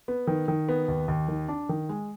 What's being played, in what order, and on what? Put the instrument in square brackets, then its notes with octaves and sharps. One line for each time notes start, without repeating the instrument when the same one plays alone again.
[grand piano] B3
D#3
D#3
B3
D#2
D#2
D#3
D4
D#3
G#3